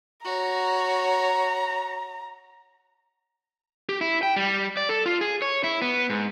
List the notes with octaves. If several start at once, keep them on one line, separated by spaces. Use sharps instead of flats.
F#4 C#5 A#5
G4
E4
G5
G3
D5
A4
F4
G#4
C#5
E4
B3
G#2